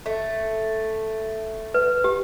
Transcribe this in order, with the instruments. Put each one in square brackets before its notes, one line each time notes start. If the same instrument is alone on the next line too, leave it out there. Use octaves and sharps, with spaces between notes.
[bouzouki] A3
[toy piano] B4
G4